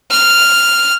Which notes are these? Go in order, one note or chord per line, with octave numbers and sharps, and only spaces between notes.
F6